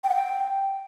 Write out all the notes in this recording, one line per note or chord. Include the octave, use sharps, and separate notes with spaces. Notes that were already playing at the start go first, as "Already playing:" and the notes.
G5
F#5
G5